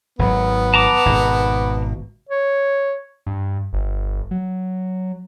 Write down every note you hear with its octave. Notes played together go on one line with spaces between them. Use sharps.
G#1 C3 F#3 B3
A5 A#5 D6
G#1 B2
C#5
G2
G1
F#3